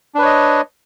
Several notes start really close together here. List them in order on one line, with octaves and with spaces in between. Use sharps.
D4 B4 C#5 D#5